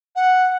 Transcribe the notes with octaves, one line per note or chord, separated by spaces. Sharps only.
F#5